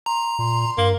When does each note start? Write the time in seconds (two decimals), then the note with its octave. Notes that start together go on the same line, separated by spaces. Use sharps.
0.06 A#5 C6
0.39 A#2 C6
0.78 G2 A#3